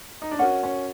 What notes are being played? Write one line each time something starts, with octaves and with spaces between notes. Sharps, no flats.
D#4
D4
C#4 F#4 A#4 D#5 F#5
C#4